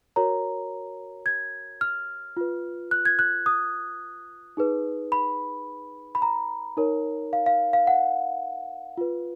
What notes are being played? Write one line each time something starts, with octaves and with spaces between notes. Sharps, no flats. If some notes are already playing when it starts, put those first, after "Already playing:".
F#4 A#4 C#5 A#5
G#6
F6
F4 B4
F#6
G#6
F#6
D#6
D#4 G#4 B4
B5
B5
A#5
D#4 A#4 C#5
F5
F5
F5
F#5
F4 B4